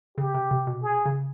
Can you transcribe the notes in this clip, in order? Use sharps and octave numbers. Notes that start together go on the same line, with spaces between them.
C#3 G4
C3
C3
B2
G#4
C#3